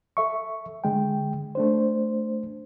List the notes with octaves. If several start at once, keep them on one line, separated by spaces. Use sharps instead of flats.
A4 E5 C#6
D3 G#3 G5
A3 D4 C5